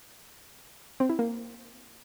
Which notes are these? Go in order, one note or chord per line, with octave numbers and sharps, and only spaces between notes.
C4
E4
A#3